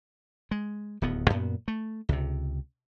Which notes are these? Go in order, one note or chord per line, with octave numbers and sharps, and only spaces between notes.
G#3
D1 D#2 B3
F#2 A#2 B3
A3
C#2 C3